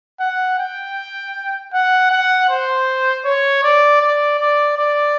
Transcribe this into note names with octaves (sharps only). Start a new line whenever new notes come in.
F#5
G5
F#5
F#5
C5
C#5
D5
D5
D5
D5